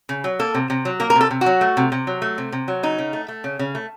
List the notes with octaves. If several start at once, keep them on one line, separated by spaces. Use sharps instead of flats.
C#3
F#3
A#3 A4
C3
C3
F#3
A#3 A#4
A#4
C3
A4
C3
F#4
F#3
A3
C3
C3
F#3
A3
C3
C3
F#3
C#3 D#4
C#3
A3
A3
C#3
C#3
A3